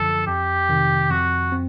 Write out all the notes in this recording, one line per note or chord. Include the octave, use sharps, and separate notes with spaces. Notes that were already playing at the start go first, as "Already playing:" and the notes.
Already playing: F#2 D3 F3 A4
F2 G4
C3 D#3
F2 F#4
C4